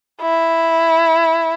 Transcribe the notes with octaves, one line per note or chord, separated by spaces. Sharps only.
E4